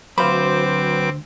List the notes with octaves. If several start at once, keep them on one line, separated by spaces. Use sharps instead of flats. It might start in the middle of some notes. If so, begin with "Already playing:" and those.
D2 F#3 C4 B4 C5 F5 B5 D6